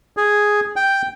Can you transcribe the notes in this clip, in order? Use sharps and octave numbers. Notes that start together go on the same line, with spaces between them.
G#4
G5